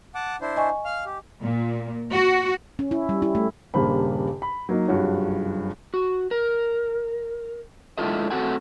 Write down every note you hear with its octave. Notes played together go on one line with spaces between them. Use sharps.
F#5 A5 D6
D4 E4 C5
D#5 G#5 C#6
F5 F6
G4
A#2
F#4
C#4
E4
G3
E4
A3
D#1 G2 C#3 A#3 C5 B5
B5
F#3 A#3 D#4
F#1 C2 G2 F4 F#4 C#5
F#4
A#4
G#3 D4 E4 F4 A4 D#5
A3 C4 F#4 A4 F#5 G#5